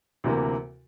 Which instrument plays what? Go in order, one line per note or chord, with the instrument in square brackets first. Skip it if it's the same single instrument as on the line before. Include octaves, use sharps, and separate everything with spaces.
[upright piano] D2 C3 E3 A#3